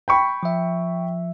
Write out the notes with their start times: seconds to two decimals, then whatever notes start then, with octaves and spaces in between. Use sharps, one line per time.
0.08 G5 B5 C#6
0.43 F3 E5